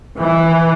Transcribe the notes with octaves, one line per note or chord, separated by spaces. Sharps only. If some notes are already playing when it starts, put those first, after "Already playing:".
E3